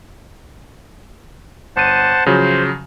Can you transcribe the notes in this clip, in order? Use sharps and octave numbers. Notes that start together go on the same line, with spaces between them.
G1 C5 F#5 A5 D#7
C#3 F3 F#3 C5